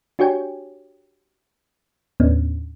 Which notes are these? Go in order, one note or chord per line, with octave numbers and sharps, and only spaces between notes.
D4 F#4 G4 C#5 G5 G#5
D#2 A2 B3 C#4 D4